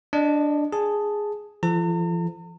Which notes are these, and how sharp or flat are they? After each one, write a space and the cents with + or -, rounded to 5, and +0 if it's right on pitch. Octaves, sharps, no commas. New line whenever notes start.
D4 +0 D#5 -20
G#4 +0 A5 +0
F3 -40 A4 -25 A#5 -45